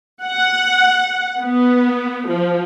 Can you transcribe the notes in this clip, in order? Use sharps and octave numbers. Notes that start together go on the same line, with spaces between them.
F#5
B3
F3